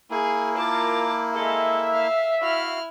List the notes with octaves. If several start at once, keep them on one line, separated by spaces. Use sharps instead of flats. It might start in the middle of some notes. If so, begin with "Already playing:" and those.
A#3 E4 G#4
F4 A#4 A5 D6
G#3 A4 E5
F5
E4 F#4 F5 F6